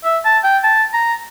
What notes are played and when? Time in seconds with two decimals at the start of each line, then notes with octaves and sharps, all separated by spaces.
0.05 E5
0.25 A5
0.44 G5
0.64 A5
0.94 A#5